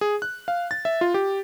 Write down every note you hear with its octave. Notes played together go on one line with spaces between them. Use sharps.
G#4
F#6
F5
A6
E5
F4
G4